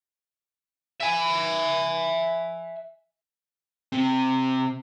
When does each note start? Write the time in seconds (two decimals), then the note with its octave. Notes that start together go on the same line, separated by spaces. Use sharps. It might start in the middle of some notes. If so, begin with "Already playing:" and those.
1.00 E5 G#5
3.92 C3